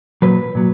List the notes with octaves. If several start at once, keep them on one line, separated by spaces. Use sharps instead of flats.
A#2 F#3 B4
A#2 F#3